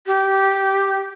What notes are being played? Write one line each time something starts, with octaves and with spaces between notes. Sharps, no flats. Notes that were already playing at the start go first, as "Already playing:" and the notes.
G4